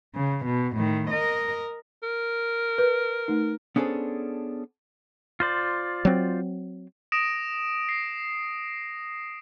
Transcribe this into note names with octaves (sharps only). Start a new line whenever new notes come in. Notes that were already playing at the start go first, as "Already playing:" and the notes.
C#3
B2
A2 D#3
A#4 D#5
A#4
B4
A3 D#4
B3 C#4 D4 G#4 A4 C5
F4 C5 D5
F#3 C4
D#6 A#6 D7 E7
A#6 C7